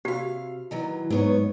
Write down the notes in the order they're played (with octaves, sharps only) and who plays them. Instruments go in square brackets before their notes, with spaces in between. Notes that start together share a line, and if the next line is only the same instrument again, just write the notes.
[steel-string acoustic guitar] C3 F5 [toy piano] F#4 G4
[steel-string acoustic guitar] D#3 E3 F#3
[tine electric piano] G#2 [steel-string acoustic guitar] F#3 B3 C#5